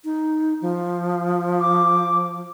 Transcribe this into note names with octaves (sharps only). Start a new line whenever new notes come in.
D#4
F3
D6